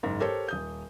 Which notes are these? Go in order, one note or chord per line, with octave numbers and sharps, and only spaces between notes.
F#1 G#2 A#4
G4 A4 A#4 C5 C#5
D#1 D#6 G6